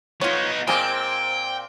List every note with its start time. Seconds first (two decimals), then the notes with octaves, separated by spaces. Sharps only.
0.21 B3 D#4 F4 C#5
0.67 A#2 G#3 A#3 C4 G5